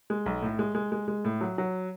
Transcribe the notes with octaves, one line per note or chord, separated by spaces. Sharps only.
G#3
B1
A2
G#3
G#3
G#3
G#3
A2
F#3
F#3